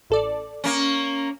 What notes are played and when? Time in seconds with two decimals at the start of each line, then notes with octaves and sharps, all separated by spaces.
0.10 A1 A4 D5
0.64 A#3 C#4